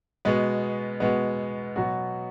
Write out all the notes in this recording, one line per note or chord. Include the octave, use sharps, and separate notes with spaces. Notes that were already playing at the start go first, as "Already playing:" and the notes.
B2 G#3 B3
B2 G#3 B3
B2 F#3 B3 F#4